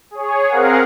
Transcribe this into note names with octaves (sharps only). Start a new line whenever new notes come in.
G#4 C#5
C4 G#4 A#4 F5 F#5